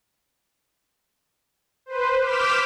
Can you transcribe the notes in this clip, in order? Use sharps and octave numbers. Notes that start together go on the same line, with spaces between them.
B4 C5
D6 F6 G6 B6 E7